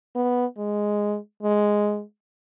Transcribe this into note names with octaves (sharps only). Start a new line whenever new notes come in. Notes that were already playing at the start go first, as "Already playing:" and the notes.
B3
G#3
G#3